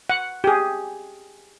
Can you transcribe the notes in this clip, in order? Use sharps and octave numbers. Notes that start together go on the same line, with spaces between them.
F#5
G4 G#4